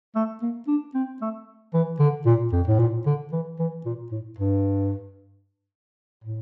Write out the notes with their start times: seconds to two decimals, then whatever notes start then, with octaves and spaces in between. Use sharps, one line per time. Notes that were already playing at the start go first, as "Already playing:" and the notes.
0.15 A3
0.42 A#3
0.67 D4
0.95 C4
1.21 A3
1.74 E3
2.00 D3
2.26 A#2
2.53 F2
2.68 A2
2.79 A#2
3.06 D3
3.32 E3
3.59 E3
3.85 A#2
4.11 A2
4.38 G2
6.24 A2